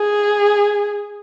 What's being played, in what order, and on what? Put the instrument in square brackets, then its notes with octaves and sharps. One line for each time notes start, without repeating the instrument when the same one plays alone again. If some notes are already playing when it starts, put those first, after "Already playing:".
Already playing: [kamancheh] G#4